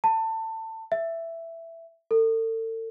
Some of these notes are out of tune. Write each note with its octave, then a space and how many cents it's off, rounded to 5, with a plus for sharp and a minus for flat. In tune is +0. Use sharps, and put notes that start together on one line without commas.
A5 +25
E5 +10
A4 +40